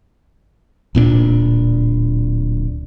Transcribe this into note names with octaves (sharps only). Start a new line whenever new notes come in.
D1 A#2 B3 D4